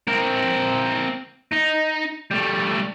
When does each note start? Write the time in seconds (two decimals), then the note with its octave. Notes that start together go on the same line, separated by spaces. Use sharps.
0.08 C4 A#4
1.53 D#4
2.31 G3 A3